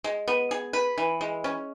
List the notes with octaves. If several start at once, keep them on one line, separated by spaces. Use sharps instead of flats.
G#3
B3
G#4
B4
E3
G#3
C#4